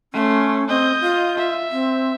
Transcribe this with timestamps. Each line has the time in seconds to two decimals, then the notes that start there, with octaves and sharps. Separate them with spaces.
0.14 A3 C#4 C6
0.68 C4 D#5 G6
1.01 F4
1.38 E5
1.71 C4